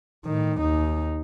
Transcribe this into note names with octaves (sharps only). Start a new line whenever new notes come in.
A2 D#3
D#2 D#4